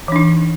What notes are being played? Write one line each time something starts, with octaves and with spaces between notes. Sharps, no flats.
E3 D4 D#4